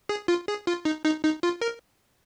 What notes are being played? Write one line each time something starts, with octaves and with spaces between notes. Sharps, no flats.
G#4
F4
G#4
F4
D#4
D#4
D#4
F4
A#4